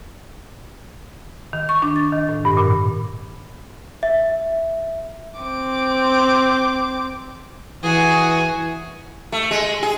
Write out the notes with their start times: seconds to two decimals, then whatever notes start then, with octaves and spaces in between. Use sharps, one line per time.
1.53 D#3
1.69 C#6
1.82 D4
1.96 A6
2.12 D#3
2.29 A2
2.45 G2
2.57 A#2
4.03 E5
5.40 C4 D6
7.83 E3 F#4 G#4
9.32 A3
9.51 G#3
9.83 G#4